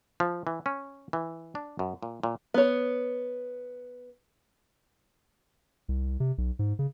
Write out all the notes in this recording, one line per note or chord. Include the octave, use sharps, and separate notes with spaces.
F3
E3
C#4
E3
D4
F#2
A#2
A#2
B3 C#5
C2
C3
B1
G#2
C#3